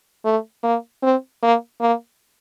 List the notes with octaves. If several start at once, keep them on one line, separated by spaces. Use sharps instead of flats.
A3
A#3
C4
A#3
A#3